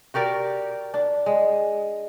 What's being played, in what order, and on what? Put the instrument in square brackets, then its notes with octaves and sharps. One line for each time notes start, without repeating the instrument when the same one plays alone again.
[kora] F#4 G4 A#4 D5
D4
G#3